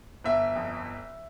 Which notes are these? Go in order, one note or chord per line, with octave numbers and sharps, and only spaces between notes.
G1 E5
F2